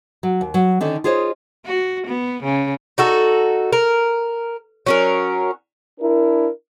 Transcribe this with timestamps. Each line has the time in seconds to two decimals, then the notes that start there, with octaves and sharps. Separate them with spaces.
0.23 F#3
0.41 D#2
0.54 F#3
0.81 D3 D#3 C#4 A4
1.04 F4 G#4 C5 C#5 D#5
1.66 F#4
2.07 B3
2.43 C#3
2.98 D#4 F#4 A4
3.72 A#4
4.86 F#3 C#4 A#4
6.00 D4 E4 A#4